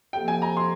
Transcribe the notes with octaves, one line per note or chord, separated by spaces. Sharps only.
F2 C3 F3 A#3 G5
G#5
A#5
C6